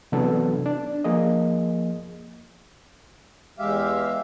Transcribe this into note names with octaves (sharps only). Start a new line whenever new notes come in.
C3 E3 F#3 B3 D4 A4
D4
F3 A#3 G#4 D#5
E2 G#3 G4 E5 F5